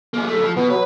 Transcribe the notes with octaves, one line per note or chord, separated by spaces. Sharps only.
A#3 G#4
F#2 A3
F3
B2 B3
F#3 B4